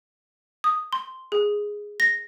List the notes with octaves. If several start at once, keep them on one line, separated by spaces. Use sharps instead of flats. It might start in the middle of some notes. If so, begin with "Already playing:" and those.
D#6
C6
G#4
A#6